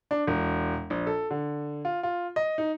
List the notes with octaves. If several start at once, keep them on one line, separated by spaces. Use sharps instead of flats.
D4
E1
A#1
A4
D3
F4
F4
D#5
D#4